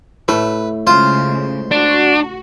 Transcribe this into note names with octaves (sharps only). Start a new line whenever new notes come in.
A2 A3 B4
C#3 G#3 F4 C5 F5
D4 F#4